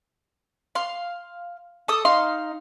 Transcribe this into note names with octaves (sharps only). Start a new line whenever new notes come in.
F5 C6
A4 D#6
D#4 F5 C6